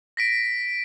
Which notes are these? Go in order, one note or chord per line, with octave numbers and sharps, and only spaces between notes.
A#6 B6 D7